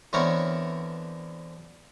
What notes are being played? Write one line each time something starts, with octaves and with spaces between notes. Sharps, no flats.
D3 E3 B3 C4 A#4 C#5